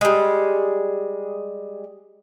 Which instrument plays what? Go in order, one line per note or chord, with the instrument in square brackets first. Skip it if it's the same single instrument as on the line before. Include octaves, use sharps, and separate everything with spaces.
[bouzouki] G3 G#3